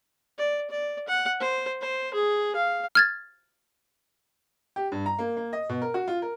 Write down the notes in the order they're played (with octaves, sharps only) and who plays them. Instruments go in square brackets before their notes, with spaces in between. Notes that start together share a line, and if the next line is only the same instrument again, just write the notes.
[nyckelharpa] D5
D5
F#5
C5
C5
G#4
F5
[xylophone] F6 G#6 A6
[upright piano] G4
G2
A#5
A#3
A#3
D#5
B2
A#4
F#4
F4
A#4